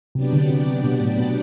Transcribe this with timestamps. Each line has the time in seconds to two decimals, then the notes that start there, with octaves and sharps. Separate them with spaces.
0.15 C3 F#3 B3 D4 G4 D5
0.33 D3
0.49 C3
0.67 C3
0.84 B2
1.00 A2
1.18 B2